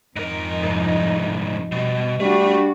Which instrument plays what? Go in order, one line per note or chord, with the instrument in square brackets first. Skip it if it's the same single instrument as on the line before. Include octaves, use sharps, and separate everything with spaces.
[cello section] F2 D#4 [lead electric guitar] G#2 A#4
[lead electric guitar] C2 G#2
[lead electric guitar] B2 [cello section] G3
[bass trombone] G3 [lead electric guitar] A3 [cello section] D4 F#4